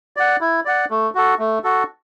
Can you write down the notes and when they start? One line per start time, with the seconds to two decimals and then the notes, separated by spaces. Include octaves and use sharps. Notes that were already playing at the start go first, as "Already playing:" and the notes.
0.17 D5 F#5
0.41 E4
0.65 D5 F#5
0.91 A3
1.15 F#4 A4
1.39 A3
1.64 F#4 A4